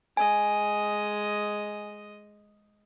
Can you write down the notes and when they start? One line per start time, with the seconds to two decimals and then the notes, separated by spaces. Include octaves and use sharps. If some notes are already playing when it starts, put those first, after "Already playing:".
0.17 G#3 D#5 G#5